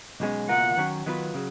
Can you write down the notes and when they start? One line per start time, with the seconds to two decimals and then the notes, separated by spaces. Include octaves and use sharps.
0.20 B1 B2 G#3 C#4
0.49 C#2 B2 A#3 F4 A#4 F#5
0.77 D#3 F#3 C#4 F#4
1.06 D#3 F#3 B3 F4 B4
1.34 C#3 F#3